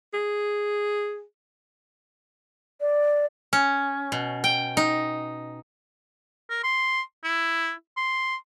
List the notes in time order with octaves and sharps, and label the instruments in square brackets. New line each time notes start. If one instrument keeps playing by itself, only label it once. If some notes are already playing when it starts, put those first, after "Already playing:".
[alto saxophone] G#4
[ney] D5
[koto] C#4
B2
G5
D#4
[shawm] A#4
C6
E4
C6